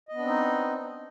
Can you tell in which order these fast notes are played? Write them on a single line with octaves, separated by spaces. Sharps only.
D#5 B3 D4 C4 D#4